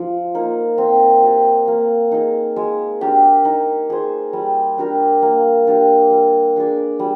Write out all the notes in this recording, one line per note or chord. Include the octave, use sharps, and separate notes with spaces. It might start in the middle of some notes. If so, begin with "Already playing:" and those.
Already playing: F3
A#3 D#4
C4
G4 D5
A#3
D#4 G#4 D#5
G#3
D4 G4 A#4
D#4
G#4 C5
G3
D4 G4 A#4
A#3
D4 G4 D5
G3
D4 G#4 D5
G3